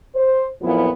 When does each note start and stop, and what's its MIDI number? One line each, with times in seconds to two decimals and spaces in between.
0.15 0.43 72
0.62 0.89 41
0.62 0.89 46
0.62 0.89 53
0.62 0.89 54
0.62 0.89 59
0.62 0.89 64